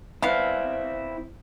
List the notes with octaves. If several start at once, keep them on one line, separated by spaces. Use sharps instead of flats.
B3 C4 E4 F5